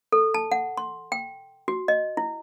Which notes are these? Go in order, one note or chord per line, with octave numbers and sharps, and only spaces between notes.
A4
A5
F#5
C6
G5
F#4
D#5
E4